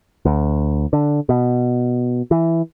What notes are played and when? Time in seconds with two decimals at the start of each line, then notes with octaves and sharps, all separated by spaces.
0.25 D2
0.93 D3
1.29 B2
2.31 E3